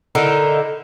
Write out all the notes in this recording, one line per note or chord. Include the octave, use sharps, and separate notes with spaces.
D3 D#4 E4 A#4